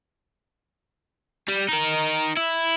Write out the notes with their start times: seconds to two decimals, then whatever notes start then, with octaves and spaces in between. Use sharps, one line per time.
1.49 G3
1.68 D#4 A#4
2.37 E4